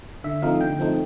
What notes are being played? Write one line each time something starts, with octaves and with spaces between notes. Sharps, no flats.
D3 E5
F3 A3 C4 D#4 F5
D3 G5
F3 A3 C4 D#4